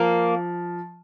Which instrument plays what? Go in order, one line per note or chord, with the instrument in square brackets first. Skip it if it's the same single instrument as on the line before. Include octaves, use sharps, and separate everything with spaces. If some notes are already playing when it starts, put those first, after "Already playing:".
Already playing: [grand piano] F3 [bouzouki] A#3